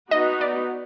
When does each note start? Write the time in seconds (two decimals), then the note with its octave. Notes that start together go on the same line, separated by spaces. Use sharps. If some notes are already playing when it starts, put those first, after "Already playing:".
0.11 B3 D#4 F#4 D#5
0.41 D5